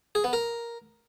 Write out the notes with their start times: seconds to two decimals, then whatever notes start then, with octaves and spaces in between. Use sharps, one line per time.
0.15 G#4
0.24 B3
0.33 A#4